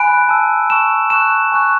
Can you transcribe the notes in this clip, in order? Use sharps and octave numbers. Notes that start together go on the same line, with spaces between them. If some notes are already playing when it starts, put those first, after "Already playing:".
Already playing: G#5 B5 F#6 D7
A5 E6
A5 C#6 E6 E7
A5 C#6 F#6 E7
G#5 C#6 F#6